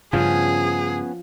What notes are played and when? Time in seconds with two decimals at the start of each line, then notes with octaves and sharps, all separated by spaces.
0.13 G2 C#3 F3 B3 C#4 G#4